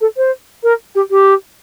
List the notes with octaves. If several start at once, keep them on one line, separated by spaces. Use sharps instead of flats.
A4
C5
A#4
G4
G4